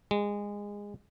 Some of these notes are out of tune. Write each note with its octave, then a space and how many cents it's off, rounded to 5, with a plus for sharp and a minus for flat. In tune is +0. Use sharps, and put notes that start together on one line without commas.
G#3 -20